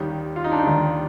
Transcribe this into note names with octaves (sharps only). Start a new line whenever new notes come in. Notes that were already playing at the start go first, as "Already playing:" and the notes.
Already playing: D#2 D#3 G3
F4
D#4
D4
D#4
D#2 D#3 G3